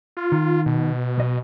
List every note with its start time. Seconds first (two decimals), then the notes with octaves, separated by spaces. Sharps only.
0.17 F4
0.32 D#3
0.66 B2
1.18 B1 D#5